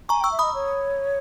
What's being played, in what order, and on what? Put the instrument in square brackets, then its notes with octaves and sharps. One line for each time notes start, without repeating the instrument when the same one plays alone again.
[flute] G#5 [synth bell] A#5 C#6
[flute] G5 [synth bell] C#6 E6
[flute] E5
[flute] D#5 [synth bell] B5 D#6
[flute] C#5